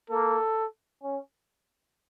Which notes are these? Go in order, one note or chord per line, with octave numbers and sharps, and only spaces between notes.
A#3 A4
C#4